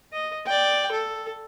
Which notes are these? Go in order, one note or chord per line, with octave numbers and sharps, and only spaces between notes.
D#5
D5 G5
A4